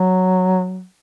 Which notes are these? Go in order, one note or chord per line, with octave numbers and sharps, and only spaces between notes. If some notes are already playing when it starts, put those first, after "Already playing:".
Already playing: F#3